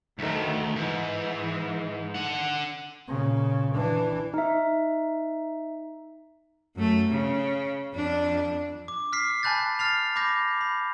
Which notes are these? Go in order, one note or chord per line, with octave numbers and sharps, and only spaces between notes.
D2 D#3 A3
G#2 E3
D4 F#5
A#2 C#3
E3 D4
D#4 E5
F#2 A3
C#3
F2 D4
D6
F6 B6 C7
G#5 A5 B5 F#6 G6 A6
F6 A6 C7 F7
B5 D6 G6 A#6
B5